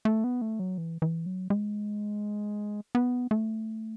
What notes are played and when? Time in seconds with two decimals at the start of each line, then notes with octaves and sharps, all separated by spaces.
0.05 A3
0.24 B3
0.41 A3
0.59 F#3
0.78 E3
1.02 E3
1.26 F#3
1.50 G#3
2.95 B3
3.31 A3